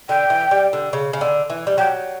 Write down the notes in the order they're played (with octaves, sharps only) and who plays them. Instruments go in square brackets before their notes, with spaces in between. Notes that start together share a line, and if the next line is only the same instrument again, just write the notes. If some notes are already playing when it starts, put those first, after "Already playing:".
[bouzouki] D3 [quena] G5
[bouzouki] E3
G3
D3
C#3
C#3
D3
E3
G3
[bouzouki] F#3 [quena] G5